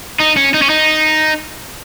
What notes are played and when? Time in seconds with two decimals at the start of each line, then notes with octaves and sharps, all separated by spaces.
0.20 D#4
0.37 C#4
0.54 D#4
0.62 C#4
0.70 D#4